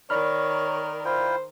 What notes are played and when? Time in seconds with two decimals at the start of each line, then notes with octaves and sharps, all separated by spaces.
0.10 D#3 A#4 C#5 D5 B5 F6
1.05 E4 F4 C5 G5